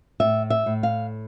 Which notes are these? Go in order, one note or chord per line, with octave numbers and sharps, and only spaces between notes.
A2 E5
E5
A2
F5